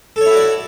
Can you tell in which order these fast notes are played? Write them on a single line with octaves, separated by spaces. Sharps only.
A4 C#5 E4 F#4 D5